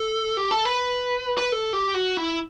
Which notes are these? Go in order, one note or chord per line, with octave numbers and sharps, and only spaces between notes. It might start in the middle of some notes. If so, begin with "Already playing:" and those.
Already playing: A4
G4
A4
B4
B4
A4
G4
F#4
E4